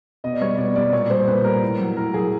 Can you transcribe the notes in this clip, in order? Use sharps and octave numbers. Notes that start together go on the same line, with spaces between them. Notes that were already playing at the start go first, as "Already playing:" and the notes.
B2 D#5
D5
G3 C#5
B2 D5
G3 D5
A#2 C#5
G3 C5
A#2 B4
G3 A#4
A2
F#3
A2 A#4
F#3 G#4